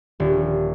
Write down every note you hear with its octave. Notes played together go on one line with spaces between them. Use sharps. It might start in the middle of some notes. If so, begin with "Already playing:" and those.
D#1